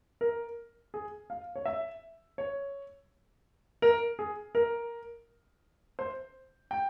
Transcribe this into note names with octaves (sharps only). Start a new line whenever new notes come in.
A#4
G#4
F5
C#5
E5
C#5
A#4
G#4
A#4
C5
G5